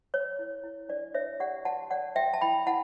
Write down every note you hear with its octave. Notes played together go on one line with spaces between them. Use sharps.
C#5
E4
E4
D4 D5
D4 C#5 E5
G4 D5 F#5
F#4 F#5 A5
C#5 D5 F#5
F#4 E5 G5
A5
E4 G5 B5
E4 F#5 A5